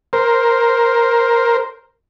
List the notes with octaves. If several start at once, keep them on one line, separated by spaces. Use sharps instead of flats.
A#4 C5